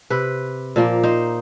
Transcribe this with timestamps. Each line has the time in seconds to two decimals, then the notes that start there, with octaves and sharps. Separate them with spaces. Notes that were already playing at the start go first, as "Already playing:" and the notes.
0.10 C3 B4
0.76 A#2 F3 A#3
1.03 D#4 C5